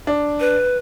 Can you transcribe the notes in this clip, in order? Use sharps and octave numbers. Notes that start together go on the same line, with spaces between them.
D4
B4